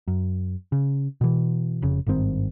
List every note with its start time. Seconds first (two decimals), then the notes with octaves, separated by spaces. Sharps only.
0.07 F#2
0.72 C#3
1.21 B2 E3
1.82 F1 C#3
2.07 G#1 G2 D#3 C4